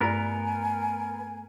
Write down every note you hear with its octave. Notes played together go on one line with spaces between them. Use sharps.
G2 A3 B3 E4 A#4 D5 G#5